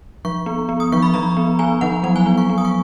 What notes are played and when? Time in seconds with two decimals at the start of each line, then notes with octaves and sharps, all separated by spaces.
0.25 F3 C#6
0.46 B3
0.69 B3
0.80 D#6
0.92 F3 C#6
1.02 B5
1.14 F3 A#5
1.37 B3
1.59 B3 G#5
1.81 F3 F#5
2.03 F#3 F#5
2.16 G#5
2.26 B3
2.38 C#6
2.50 B3
2.58 D#6
2.65 C#6